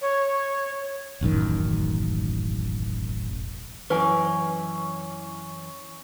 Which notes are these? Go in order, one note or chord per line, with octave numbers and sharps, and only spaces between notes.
C#5
E1 A1 F#2 D#3
F#2 E3 C#4 B4 G#5